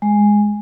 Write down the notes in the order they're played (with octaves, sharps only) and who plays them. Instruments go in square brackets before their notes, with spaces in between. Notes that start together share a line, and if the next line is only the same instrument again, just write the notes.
[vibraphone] G#3